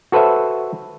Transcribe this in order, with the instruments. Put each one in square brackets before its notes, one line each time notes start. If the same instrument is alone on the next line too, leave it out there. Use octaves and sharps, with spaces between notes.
[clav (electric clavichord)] F#4 A4 B4 C5 E5